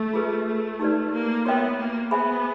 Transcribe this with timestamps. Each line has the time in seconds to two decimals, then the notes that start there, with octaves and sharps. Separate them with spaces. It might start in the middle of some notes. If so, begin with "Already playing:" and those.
Already playing: A3
0.13 F4 G#4 B4
0.46 A3
0.79 D#4 G4 B4 D5
1.12 A#3
1.45 B3 F#4 A#4 C#5 E5 G5
1.79 A#3
2.11 B3 G#4 C5 E5 G#5 B5